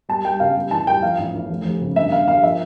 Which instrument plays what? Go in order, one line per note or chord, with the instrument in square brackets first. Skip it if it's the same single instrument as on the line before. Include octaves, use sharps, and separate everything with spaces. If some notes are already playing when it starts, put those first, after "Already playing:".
[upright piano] G3 A5
G3 G5
C#3 F5
G3
E3 A5
G3 G5
F3 F5
A1
A1
F1
F1
C#3
G2 E5
G1 F5
G1 F5
F3 E5